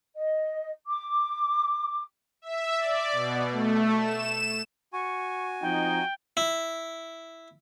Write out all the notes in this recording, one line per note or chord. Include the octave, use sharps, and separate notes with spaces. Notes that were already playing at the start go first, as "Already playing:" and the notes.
D#5
D6
E5
D5
B2
A3
E7
F#4 G#5 C#6
F3 C4 D#4 G5
E4